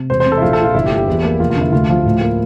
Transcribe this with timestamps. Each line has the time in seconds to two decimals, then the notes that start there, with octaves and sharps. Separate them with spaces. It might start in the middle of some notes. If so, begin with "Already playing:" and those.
Already playing: C3
0.10 E1 C5
0.20 C5
0.26 C3
0.32 A4
0.37 E4
0.42 A#1 F4
0.53 A4
0.58 F3
0.64 F4
0.74 G1 E4
0.86 G4
0.91 F3
0.97 G4
1.08 E2
1.23 A#3
1.40 F1 F4
1.50 F4
1.56 D3 E4
1.72 D2 F4
1.89 F3
2.05 A2
2.21 A#3